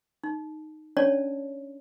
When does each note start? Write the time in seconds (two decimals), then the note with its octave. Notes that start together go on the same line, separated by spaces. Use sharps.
0.24 D#4
0.97 C#4 D4 C#5 D5 A5